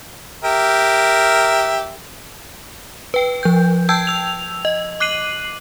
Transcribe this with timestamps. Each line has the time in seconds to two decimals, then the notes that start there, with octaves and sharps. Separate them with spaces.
0.44 G4 A#4 E5
3.14 B4 G5
3.43 F3 G6
3.89 G5 A5 E6 G6 G#6
4.07 E6 F7
4.65 D#5
5.00 D6 F#6 C7 D#7 F#7